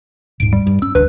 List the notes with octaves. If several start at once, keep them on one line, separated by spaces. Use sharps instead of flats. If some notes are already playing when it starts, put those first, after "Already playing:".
D#1 G#2 D7
G3
G2
C#4 E6
E1 D2 D4 B4